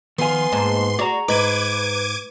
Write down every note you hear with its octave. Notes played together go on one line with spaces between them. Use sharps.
D#3 F3 B3 F5 G#5 C6
G#2 A#3 A5
F#4 G#4 D5 A#5
G#2 B4 D6 G#6 D#7